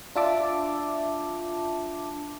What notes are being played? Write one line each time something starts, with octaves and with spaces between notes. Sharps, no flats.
D4 F4 E5 A5 D6